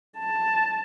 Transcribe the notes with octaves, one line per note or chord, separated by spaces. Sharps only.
A5